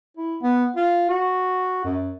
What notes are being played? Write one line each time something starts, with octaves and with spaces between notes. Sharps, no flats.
E4
B3
F4
F#4
F#2